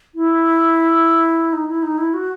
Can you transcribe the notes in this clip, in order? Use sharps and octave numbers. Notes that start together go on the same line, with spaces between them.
E4
D#4
E4
D#4
E4
F#4